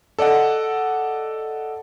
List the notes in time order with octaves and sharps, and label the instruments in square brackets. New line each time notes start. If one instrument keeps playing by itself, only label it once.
[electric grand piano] A4 D5 D#5 F#5